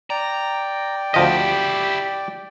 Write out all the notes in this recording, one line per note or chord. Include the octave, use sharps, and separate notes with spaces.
D5 G5 A#5
D2 F3 E4 G4 D#5